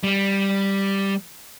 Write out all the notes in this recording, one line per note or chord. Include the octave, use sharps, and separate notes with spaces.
G3